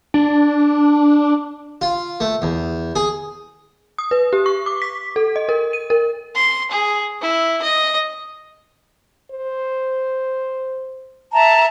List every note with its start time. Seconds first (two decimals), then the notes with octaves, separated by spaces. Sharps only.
0.14 D4
1.81 F4
2.20 A3
2.42 E2
2.96 G#4
3.98 D#6
4.11 B4
4.33 G4
4.46 C#6
4.66 D6
4.82 B6
5.16 A4
5.36 D#5
5.49 A#4
5.73 D#7
5.90 A#4
6.35 C6
6.71 G#4
7.21 E4
7.62 D#5
9.31 C5
11.32 E5 A5 A#5